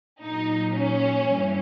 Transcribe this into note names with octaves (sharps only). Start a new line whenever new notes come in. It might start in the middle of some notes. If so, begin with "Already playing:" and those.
A#2 F#3 D#4
C#4
G2 E3 G3